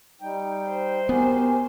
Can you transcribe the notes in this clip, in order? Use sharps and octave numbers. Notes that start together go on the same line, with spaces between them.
G3 D#4 G5
C5
B3 F#4 G4 A#4 G#5